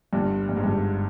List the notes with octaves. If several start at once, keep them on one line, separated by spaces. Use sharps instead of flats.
G1 G2
G2
G#2
G1 G2